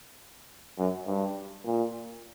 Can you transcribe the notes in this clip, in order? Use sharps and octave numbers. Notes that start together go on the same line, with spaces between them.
F#2
G2
A#2